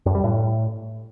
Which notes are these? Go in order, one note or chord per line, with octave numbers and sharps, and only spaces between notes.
F#2
G3
A2